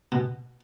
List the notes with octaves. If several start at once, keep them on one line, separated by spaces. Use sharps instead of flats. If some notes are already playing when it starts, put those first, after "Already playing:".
B2